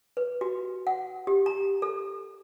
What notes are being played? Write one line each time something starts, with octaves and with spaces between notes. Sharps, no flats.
B4
F#4
F#5
G4
A#5
A4